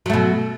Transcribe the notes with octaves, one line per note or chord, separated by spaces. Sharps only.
B2 F#3 A3